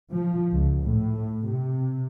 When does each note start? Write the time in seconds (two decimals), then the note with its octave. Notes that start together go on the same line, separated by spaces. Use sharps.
0.11 F3
0.52 C#2
0.84 A2
1.47 C3